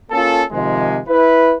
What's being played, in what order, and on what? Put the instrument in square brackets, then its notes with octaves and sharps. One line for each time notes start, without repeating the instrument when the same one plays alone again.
[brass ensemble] A#3 C#4 F4 A4
C3 D#3 F3 G#3
E4 B4